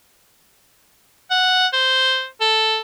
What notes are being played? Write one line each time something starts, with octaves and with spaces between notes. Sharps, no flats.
F#5
C5
A4